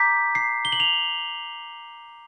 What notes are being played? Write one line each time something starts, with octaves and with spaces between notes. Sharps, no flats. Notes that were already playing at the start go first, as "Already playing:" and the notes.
Already playing: A#5 D6 G6 B6
C7
G7
F#7
F7